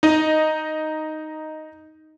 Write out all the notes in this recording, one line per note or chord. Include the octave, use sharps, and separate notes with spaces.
D#4 D#5